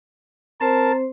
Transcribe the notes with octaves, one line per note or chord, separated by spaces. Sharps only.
C4 A#4 C5 A5